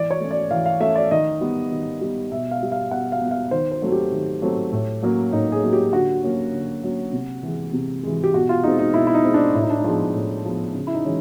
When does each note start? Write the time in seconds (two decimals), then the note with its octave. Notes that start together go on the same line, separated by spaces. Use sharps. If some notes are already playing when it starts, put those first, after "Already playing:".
Already playing: E3 D5
0.11 C#5
0.20 A3 C#4
0.31 D5
0.51 E3 F5
0.66 F5
0.80 A3 C#4 E5
0.96 D5
1.11 D#3 D#5
1.41 G3 B3
1.72 D#3
2.01 G3 B3
2.31 B2 E5
2.51 F5
2.62 G3 B3
2.72 F5
2.91 B2 F#5
3.12 F5
3.21 G3 B3
3.31 F5
3.51 D#3 C5
3.72 C5
3.82 F#3 A3 C4
3.92 G4
4.12 D#3
4.42 F#3 A3 C4
4.72 A2
5.03 F#3 A#3 C#4
5.32 A2 D#4
5.52 G#4
5.63 F#3 A#3 C#4
5.73 G4
5.93 D3 F#4
6.23 F#3 A#3 C#4
6.53 D3
6.83 F#3 A#3 C#4
7.13 C3
7.43 E3 G#3
7.73 C3
8.03 E3 G#3
8.24 G4
8.34 B2 F#4
8.49 F4
8.63 G#3 C4 D#4
8.79 D#4
8.94 B2 E4
9.07 E4
9.14 D#4
9.24 G#3 C4
9.34 D4
9.54 A2 E4
9.62 D#4
9.70 D4
9.78 D#4
9.84 F3 G#3 B3
10.14 A2
10.45 F3 G#3 B3
10.75 C#3
10.87 E4
10.94 D#4
11.05 E3 G#3 C#4